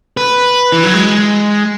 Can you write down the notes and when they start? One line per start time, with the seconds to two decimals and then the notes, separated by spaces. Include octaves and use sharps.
0.17 B4
0.72 E3
0.83 F#3
0.94 G#3